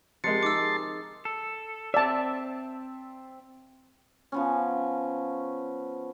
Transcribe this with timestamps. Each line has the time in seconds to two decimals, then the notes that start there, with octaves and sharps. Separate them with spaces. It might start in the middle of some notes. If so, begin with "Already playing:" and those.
0.24 C3 F3 G#3 A#4 A5 C6 C#7
0.43 D#4 G#4 D6 E6
0.60 D#4 G#4
1.25 A4
1.94 C4 D5 E5 A5
4.32 F3 B3 C#4